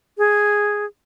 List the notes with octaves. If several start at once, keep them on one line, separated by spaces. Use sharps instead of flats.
G#4